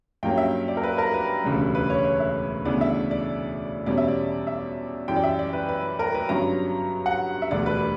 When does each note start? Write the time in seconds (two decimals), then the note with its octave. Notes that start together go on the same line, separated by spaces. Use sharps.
0.23 G2 F#3 A#3 C#4 G5
0.38 E5
0.68 D5
0.77 A#4
0.83 B4
0.98 A#4
1.14 B4
1.44 E1 D2 C#3 G3
1.75 B4
1.90 C#5
2.05 C#5
2.20 E5
2.65 D2 C#3 E3 B3 D4 D5
2.81 E5
3.11 D5
3.86 E2 B2 G3 C#4 D5
3.98 E5
4.08 D5
4.47 E5
5.08 F#2 E3 G3 G5
5.16 D5
5.24 E5
5.39 D5
5.53 B4
5.69 B4
5.99 A#4
6.14 B4
6.29 G1 G2 F#3 C#4 A#5
7.06 F#5
7.42 E5
7.51 E1 D2 D3 G3 D5
7.66 B4